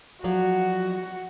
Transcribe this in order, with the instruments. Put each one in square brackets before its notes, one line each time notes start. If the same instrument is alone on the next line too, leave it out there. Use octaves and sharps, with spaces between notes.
[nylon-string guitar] F3 F#3 D5 [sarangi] F#4